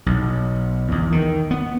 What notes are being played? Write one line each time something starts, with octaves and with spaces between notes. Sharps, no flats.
B1
E2
D#3
B3